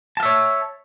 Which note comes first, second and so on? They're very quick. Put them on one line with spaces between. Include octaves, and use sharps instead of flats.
A5 F5 E5 C#5